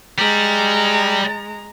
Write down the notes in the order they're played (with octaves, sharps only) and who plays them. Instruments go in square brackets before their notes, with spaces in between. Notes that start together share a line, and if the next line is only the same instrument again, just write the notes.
[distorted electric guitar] G3 [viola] G#3 A#5